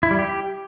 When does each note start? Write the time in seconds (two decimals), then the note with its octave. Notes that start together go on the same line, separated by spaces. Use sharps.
0.03 E4
0.11 G3
0.19 G4